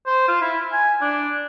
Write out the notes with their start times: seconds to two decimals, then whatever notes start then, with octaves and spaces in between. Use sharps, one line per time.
0.06 C5
0.28 F4
0.41 E4
0.72 G#5
1.01 D4